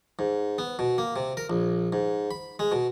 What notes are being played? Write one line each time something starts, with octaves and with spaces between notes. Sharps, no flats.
G#2
B3
B2
A#3
C3
A#4
A#1
G#2
B5
G#3
B2